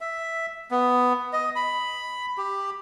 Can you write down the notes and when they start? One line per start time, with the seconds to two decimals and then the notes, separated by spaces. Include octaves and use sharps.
0.01 E5
0.71 B3
1.33 D#5
1.56 B5
2.37 G4